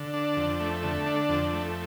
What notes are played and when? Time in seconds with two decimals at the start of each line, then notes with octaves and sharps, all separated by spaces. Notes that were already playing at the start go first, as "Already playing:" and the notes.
Already playing: D3
0.14 D4
0.37 F2
0.60 A3
0.83 D3
1.06 D4
1.29 F2
1.53 A3